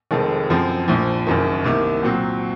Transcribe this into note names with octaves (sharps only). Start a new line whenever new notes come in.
F1 F2 D#3 G#3
F#2 F3 C4
A#1 A#2 F3
F#1 F#2 D#3
C2 C3 D#3 A#3
A#2 F#3 C4